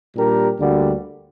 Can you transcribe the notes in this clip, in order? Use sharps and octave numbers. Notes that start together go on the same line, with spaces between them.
A#2 G3 D4 G4 A#4
D2 D3 G3 A#3 F#4